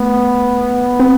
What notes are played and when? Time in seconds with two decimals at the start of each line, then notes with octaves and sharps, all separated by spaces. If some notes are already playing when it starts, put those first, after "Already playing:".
Already playing: A3 B3
1.00 C4